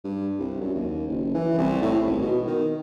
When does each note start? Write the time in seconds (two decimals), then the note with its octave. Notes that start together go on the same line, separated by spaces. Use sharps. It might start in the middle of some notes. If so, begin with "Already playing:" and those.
0.04 G2
0.39 C2
0.61 F#2
0.75 D#2
1.07 F#1
1.34 E3
1.58 C2
1.82 A2
2.07 G#1
2.22 B2
2.47 D#3